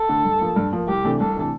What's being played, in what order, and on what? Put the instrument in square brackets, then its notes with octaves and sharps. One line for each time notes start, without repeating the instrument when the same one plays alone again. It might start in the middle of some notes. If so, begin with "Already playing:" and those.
Already playing: [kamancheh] A4
[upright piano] D3 A3 D4
G2
F3 A#3
G2
F3 A#3
[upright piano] C2 [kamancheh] G4
[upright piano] C3 E3 A3 D4
[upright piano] C2 [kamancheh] A4
[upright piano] C3 E3 A3 D4